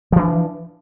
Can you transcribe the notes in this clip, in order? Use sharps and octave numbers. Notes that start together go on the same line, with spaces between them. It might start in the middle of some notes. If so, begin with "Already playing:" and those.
E3 F3 D4